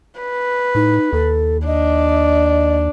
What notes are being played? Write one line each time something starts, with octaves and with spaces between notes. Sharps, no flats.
B4
A2 D#4
D#2 A4
D4 D#5